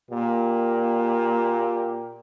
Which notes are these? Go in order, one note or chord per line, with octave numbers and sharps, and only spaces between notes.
A#2 A#3 G4